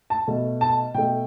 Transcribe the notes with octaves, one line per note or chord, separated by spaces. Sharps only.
A5
B2 A3
A5
B2 A3 G5